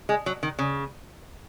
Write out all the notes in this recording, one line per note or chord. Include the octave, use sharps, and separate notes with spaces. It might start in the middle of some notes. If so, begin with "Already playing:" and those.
G#3
F#3
D#3
C#3